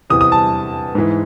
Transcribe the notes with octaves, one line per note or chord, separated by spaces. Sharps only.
E2 C3 E3 D#6
D#6
A5
G#2 E3